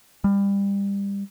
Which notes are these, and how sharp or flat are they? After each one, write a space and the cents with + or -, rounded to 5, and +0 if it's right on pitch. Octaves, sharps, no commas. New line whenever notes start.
G3 +25